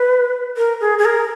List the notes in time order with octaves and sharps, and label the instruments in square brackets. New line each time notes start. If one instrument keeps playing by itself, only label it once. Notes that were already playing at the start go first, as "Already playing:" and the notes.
Already playing: [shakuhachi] B4
A#4
G#4
G#4
A#4